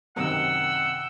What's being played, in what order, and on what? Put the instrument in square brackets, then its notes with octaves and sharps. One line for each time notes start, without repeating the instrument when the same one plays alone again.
[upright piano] F#2 C3 D#3 [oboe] F#5 [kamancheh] G5 E6